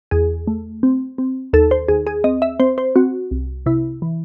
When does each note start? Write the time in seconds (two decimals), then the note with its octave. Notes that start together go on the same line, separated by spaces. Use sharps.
0.11 E2 G#4
0.47 A3
0.83 C4
1.18 C4
1.53 D#2 A4
1.71 C5
1.88 D#2 G#4
2.07 G#4
2.24 C4 D#5
2.42 E5
2.60 C4 C5
2.78 C5
2.96 C4 F#4
3.31 C2
3.66 C3 E4
4.02 E3